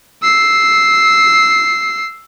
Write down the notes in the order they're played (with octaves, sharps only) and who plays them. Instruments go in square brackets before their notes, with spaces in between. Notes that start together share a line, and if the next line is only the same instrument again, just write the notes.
[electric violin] E6 C7